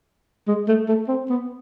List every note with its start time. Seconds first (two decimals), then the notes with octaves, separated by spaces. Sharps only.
0.48 G#3
0.68 A3
0.88 A3
1.08 C4
1.30 B3